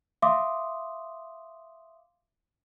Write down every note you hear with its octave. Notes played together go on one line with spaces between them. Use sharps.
E5 F5 C6 D6 D#6